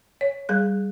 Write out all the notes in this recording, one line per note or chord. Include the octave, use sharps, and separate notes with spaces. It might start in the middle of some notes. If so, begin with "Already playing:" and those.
C#5
G3 G#4 F#6